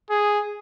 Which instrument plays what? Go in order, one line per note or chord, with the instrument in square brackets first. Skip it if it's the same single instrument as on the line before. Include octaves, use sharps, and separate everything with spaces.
[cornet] G#4